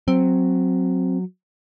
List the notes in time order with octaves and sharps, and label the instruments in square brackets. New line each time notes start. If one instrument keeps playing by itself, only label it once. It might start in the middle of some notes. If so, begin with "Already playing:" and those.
[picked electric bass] F#3 [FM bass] C4